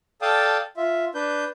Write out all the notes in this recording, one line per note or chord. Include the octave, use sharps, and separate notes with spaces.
A4 D5 F5 G5 A5 D#6
F4 E5
D4 B4 G6